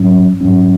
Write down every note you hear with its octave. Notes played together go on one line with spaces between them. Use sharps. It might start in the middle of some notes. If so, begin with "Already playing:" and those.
Already playing: G#2 F#3 C#4
G#2 F#3 C#4